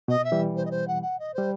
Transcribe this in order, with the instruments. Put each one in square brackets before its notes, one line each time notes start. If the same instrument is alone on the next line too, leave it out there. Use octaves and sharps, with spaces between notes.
[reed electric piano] B2 [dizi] D#5
[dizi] E5
[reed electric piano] E3 G3
[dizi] C5
D#5
C5
F#5
F#5
D#5
[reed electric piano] G3 [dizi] C5